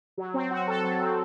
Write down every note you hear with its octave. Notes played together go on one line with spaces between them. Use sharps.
F#3
C4
F#4
A4
F#3
C4